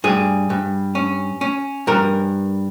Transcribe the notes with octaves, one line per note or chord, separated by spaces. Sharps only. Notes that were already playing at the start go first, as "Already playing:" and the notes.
G2 G#4
G2
C#4
C#4
G2 A#4